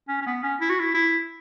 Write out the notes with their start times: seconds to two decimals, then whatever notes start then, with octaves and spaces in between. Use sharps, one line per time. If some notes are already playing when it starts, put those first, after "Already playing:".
0.08 C#4
0.21 C#4
0.26 B3
0.43 C#4
0.61 E4
0.69 F#4
0.79 E4
0.94 E4